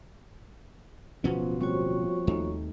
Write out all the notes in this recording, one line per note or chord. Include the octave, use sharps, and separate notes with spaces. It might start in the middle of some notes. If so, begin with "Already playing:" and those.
D1 B2 F3 B3 C#4 F4 F#4
F3 G3 A#3 C4 F#4 C#5 C#6
D#2 A3 D#4